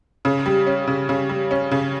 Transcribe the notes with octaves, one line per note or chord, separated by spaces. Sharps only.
C#3
G3
C#4
C#3
C#3
G3
C#4
C#3